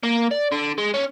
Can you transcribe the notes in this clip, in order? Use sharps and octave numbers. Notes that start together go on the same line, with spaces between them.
A#3
D5
D3
G#3
C#4